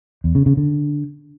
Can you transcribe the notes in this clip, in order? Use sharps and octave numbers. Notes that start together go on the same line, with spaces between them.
E2
C#3
C#3
D3